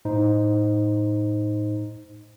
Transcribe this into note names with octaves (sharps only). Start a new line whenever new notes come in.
A2 D#4 C5